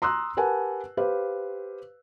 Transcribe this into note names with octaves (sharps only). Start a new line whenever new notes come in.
A#5 C6 D#6 E6 F#6
G4 A#4 B4 F#5 G#5 A5
G4 B4 C5 F5